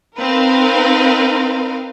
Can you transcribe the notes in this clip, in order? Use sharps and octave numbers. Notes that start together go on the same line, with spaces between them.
C4 D#4 A#4 B4 F5